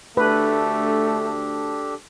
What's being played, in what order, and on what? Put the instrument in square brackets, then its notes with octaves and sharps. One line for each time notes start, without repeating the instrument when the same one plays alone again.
[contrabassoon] D2 [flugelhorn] A3 [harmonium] D4 G4 A4 [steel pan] B4